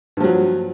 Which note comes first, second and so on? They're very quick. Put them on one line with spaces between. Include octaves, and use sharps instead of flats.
G2 F3 F#3